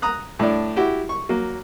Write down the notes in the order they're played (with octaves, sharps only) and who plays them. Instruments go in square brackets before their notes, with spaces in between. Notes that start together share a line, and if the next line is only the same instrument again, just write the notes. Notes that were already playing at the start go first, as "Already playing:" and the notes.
[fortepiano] A#5 D#6 F#6
A2 D4
E4 F#4 G4
C#6
F#3 A#3